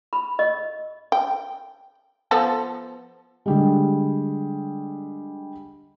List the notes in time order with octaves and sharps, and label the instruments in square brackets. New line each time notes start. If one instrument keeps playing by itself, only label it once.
[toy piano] B5
D#5
[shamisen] G5
F3 B3 A4
[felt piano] D3 G3 G#3